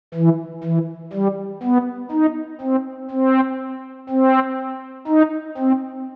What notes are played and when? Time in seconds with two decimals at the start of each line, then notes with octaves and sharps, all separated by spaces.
0.14 E3
0.64 E3
1.13 G3
1.63 B3
2.11 D#4
2.61 C4
3.11 C4
4.10 C4
5.07 D#4
5.57 C4